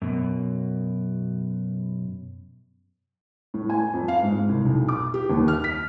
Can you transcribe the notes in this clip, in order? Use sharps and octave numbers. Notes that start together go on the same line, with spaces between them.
F#2 B2
A2
G#5
F2
F5
G#2
C2
B1
D6
G4
D#2
F6
B6